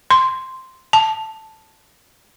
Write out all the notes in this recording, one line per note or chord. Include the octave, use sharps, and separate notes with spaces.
C6
A5